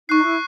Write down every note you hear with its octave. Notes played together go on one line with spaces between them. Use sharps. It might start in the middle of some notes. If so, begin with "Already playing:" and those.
D#4 C#6 F#6 C7
E4